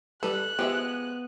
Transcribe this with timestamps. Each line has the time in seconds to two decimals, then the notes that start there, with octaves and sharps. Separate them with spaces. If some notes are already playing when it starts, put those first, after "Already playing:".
0.23 G3 A4 B4 F#6
0.59 F3 G#3 B3 G4 E5